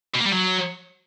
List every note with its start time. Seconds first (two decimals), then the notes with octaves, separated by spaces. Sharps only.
0.15 B2
0.21 A#3
0.26 G3
0.32 F#3